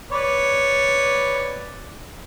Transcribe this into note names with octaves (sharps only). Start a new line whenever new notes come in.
B4 C#5 D5